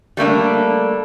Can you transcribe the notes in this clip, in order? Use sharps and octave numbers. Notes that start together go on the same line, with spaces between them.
G3 A3 A#3 D4